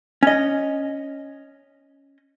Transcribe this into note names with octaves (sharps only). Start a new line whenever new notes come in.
C#4 D#5